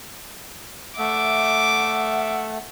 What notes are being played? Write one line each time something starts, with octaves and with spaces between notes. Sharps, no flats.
A3 E5 F#5 D6